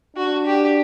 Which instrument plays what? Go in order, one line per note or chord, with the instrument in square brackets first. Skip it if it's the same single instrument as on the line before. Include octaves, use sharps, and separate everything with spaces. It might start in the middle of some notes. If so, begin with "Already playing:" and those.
[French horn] D4 [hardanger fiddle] F#4
[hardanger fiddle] G4